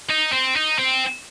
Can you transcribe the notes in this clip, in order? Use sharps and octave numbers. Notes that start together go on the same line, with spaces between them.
D#4
C4
D#4
C4